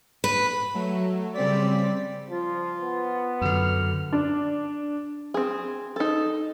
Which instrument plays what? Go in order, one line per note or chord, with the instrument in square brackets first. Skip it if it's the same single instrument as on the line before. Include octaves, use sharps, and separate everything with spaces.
[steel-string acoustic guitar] B4
[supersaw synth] F#3 A3
[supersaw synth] C#3 C4 B6 [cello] G3 D5
[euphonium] F3 [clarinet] F4
[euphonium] B3
[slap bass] F#2 D3 [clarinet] F6
[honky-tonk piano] D4
[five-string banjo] C4 G#4
D#4 A4